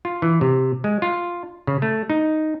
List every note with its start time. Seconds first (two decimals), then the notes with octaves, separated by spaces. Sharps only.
0.05 F4
0.22 E3
0.41 C3
0.84 G#3
1.02 F4
1.67 C#3
1.82 A3
2.10 D#4